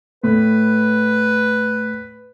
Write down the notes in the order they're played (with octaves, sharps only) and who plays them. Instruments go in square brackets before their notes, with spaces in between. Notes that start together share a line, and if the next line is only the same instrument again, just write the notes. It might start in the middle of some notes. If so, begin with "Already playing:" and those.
[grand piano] A2 [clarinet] B4